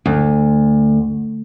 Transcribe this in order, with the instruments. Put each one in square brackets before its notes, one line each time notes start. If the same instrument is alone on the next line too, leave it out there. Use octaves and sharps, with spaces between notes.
[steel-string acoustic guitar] D2